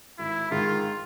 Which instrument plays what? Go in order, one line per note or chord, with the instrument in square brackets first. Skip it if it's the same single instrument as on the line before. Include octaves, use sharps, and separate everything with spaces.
[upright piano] G#1 [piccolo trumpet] E4
[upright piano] G#2 D#3 G#3 [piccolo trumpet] F4